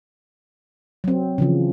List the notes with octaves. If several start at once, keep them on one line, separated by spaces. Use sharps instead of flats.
F#3 C4
C#3 E3 F3